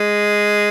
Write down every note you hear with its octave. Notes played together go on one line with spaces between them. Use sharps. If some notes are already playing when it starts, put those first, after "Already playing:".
Already playing: G#3